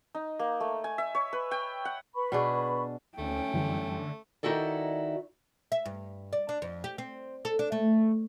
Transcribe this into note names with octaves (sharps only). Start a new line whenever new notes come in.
D#4
A#3
A3
G#5
E5
C#5
B4
G5
F#5
B4 B5 C#6
B2 D4 G#4
D2 A3 C#4 G5
F#2 D3 E3 G3
D#3 D#4 E4 F#4 A4 D5
E5
G2
D5
D4
F2
G4
C4
A4
D4
A3